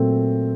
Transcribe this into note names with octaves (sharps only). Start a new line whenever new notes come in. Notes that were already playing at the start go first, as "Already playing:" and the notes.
Already playing: A#2 F#3 A3 C4